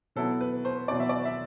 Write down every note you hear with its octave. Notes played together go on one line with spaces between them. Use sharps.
B2 F#3 B3 E4 A4
B4
C5
B2 F#3 B3 E4 D5
E5
D5
E5